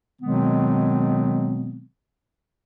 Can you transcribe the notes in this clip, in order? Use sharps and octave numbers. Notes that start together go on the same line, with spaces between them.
B2 D#3 F#3 G#3 B3 C4